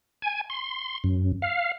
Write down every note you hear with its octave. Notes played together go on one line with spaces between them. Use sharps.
G#5
C6
F#2
F5